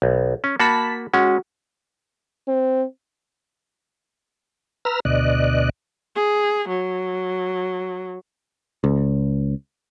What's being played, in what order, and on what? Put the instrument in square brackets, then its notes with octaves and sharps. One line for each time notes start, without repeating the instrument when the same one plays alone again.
[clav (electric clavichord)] B1
C#4
[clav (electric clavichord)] A#3 F#4 [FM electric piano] A5 B5 B6
[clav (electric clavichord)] G#3 C#4 [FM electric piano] F#4
[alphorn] C4
[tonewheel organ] B4 A#5 E6 F6
D2 B2 D5 D#5 F#6
[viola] G#4
F#3
[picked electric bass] C#2